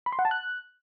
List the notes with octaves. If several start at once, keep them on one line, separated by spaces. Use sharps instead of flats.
B5
C6
F#5
A5
F#6